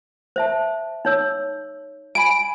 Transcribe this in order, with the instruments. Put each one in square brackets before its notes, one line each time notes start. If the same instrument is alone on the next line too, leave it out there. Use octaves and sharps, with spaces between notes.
[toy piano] C5 E5 A5
D#4 C#5 E6
[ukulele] G#5 B5 [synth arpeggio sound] D7